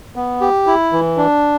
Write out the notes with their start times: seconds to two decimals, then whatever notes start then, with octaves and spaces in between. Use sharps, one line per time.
0.16 B3
0.41 G4
0.67 E4
0.93 E3
1.17 D4